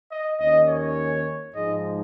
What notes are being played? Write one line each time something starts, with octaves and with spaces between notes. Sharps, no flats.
D#5
D#2 D#3 C#4 D#5
C#5
G#2 F3 G#3 D#4 D#5